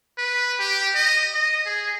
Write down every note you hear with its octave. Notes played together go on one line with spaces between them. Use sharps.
B4
G4
D#5
D#5
G#4